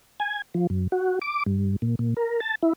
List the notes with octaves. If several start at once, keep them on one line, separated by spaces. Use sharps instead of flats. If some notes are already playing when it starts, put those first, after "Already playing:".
G#5
F3
F#2
F#4
D6
G2
A#2
A#2
A#4
A5
E4